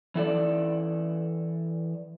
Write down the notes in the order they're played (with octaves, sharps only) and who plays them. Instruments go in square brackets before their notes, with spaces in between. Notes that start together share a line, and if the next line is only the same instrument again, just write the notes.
[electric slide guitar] E3 A4 D5